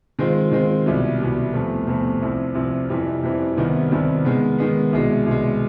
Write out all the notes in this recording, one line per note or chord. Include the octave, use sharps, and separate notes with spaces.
D#3 G#3 C4 F4
D#3 G#3 C4 F4
C2 B2 G3
C2 B2 G3
E2 C3 F3 A3
E2 C3 F3 A3
C2 C3 F3
C2 C3 F3
F2 C3 E3 G3
F2 C3 E3 G3
C2 C3 D#3 G3 B3
C2 C3 D#3 G3 B3
D#3 G#3 B3
D#3 G#3 B3
C2 B2 G#3
C2 B2 G#3